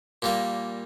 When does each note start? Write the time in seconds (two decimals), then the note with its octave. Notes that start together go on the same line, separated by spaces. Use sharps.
0.22 A#2 G3 A#3